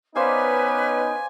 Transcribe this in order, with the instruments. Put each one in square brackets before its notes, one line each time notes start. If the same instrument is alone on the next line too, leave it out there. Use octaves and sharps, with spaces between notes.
[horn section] B3 C#4 D#4 [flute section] B4 [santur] C5 D5 F5 [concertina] G#5